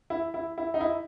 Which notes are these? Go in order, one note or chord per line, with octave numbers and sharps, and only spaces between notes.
E4
E4
E4
D#4
E4